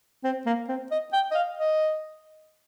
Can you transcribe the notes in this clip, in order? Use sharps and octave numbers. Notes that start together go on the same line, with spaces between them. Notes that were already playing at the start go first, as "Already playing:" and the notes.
C4
A#3
C4
D#5
G5
D#5
F5
D#5